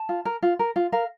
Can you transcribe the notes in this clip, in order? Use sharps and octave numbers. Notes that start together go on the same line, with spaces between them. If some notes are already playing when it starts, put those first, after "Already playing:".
Already playing: A5
F4
A#4
F4
A#4
F4
A#4 F5